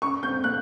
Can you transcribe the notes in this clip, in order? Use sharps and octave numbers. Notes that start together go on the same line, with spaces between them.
C#4 C#6
C4 G6
A#3 F#6